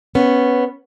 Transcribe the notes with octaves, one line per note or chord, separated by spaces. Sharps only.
B3 C#4